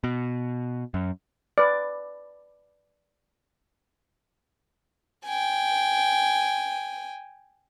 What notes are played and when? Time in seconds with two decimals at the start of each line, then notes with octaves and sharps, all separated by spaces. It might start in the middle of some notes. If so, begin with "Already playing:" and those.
0.04 B2
0.94 F#2
1.58 B4 D5
5.26 G5 G#5